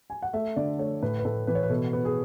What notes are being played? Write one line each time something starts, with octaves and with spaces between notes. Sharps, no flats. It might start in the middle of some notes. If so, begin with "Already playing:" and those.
G#5
F#5
A3 E5
D3 D5
A3 C#5
A2 B4
B4
A2 A4
E3 B4
C#5
B4
B2 A4
B3
G#4